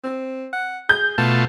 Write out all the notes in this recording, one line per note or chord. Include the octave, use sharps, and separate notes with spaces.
C4
F#5
G#4 G6
B2 A3 F4 A5